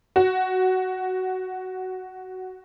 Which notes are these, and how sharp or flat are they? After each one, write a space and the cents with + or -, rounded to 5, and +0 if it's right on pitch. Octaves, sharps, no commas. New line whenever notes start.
F#4 +5